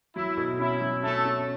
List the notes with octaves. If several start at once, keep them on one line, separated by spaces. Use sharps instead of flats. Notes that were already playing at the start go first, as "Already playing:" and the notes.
F#3 E4
B2
C#4 E4
F#3
A3 C#4 A4
C#4